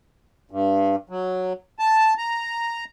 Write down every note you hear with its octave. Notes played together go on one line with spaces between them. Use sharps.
G2
F#3
A5
A#5